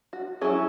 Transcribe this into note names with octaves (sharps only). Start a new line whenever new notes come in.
F#4
F#3 C#4 E4 G#4